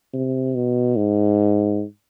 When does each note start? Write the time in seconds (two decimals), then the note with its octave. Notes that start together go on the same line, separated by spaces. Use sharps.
0.13 C3
0.55 B2
0.96 G#2